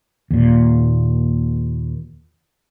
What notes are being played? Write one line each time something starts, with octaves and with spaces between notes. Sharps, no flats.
D#2 A#2